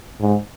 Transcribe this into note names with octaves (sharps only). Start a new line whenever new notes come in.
G#2